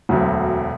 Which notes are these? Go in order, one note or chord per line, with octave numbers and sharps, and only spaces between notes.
E1 D2 D3 F#3